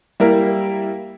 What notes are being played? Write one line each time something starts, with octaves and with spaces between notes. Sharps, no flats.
G3 A#3 E4 A#4